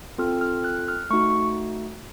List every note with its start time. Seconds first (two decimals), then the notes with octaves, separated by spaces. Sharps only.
0.18 C4 F4 A4 F6
0.41 F6
0.64 F#6
0.88 F6
1.10 A3 D#4 F#4 C#6